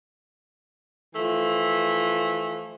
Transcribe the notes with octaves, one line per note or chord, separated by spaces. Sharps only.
E3 F3 A3